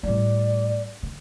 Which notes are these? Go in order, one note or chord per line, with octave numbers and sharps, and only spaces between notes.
A2 G3 D5
D3